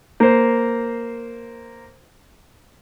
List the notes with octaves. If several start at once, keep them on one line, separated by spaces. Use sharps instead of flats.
A#3 C5